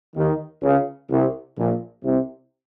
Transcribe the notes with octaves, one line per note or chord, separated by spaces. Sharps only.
D#2 D#3
C#2 C#3
C2 C3
A#1 A#2
C2 C3